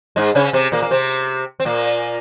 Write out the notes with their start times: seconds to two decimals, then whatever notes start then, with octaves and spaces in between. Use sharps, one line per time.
0.16 G#2 G#3
0.35 C#3 C#4
0.53 C3 C4
0.72 A#2 A#3
0.82 A#3
0.91 C3 C4
1.60 C4
1.65 A#2 A#3